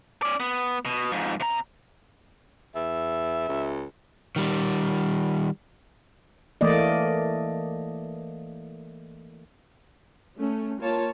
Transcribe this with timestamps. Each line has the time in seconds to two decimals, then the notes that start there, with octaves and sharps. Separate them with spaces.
0.22 C#4 D5
0.40 B3
0.85 B2
1.12 F2 G#2
1.40 C3 A#5
2.75 E2 E5
3.49 C#2
4.36 D#3 G3
6.61 E3 A3 A#3 D5 D#5
10.38 A3 C#4
10.80 A#3 F4 C#5 A5